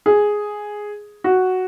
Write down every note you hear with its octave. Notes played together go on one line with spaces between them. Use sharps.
G#4
F#4